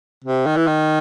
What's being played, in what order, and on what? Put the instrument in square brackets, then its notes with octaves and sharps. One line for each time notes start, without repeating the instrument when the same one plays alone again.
[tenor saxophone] C3
D#3
E3
D#3